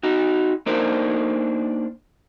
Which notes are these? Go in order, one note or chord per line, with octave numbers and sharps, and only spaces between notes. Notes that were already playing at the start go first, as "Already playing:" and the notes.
D#4 F#4
A#3 D4 D#4 A#4 C5 D5